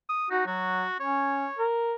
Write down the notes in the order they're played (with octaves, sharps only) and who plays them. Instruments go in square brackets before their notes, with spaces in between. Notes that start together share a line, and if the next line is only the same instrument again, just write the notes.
[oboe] D#6
[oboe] D#4 [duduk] F#4
[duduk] F#3 [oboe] F#4
[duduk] C#4 [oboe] C#5
[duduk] A#4